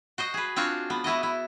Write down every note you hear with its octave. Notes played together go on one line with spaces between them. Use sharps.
F#4 C5 D#5
G#4 B4
C4 D4 F4 F#4 C#5
B3
B3 E4 F#4 D#5
E4